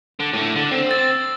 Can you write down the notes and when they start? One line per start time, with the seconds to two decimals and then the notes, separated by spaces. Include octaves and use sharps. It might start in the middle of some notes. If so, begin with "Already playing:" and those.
0.20 D3
0.34 A2 A3 D6
0.56 D3
0.72 C4
0.86 E6 A6